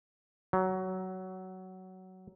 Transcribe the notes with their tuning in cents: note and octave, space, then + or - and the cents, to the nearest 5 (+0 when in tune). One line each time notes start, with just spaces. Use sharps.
F#3 +15